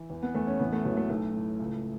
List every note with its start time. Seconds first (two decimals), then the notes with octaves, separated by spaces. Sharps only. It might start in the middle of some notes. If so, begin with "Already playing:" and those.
Already playing: E3
0.10 E2
0.23 B3
0.35 E2 A3
0.47 C#4
0.59 A1 B3
0.72 A3
0.85 A1 F#3
0.97 A3
1.09 B1 A3
1.34 A2
1.59 C#2